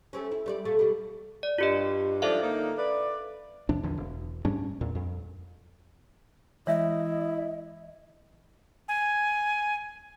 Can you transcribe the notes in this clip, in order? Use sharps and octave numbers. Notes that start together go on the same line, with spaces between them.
A3 C4 C#4
E4
G3 C5 D5
A#2 A3 A4
B2 G3
D5
G2 F4 G4 D#5
G#2 F3 D4 A4 E5 F5
D3 A#3 D#4
B4 D5
E2 C3 F3 D4
A#1 E2 D3 F3
E1
G#2 G3 C#4 D4
E2 A#2
F2
E3 G#3 E4 C#5 D#5 E5
G#5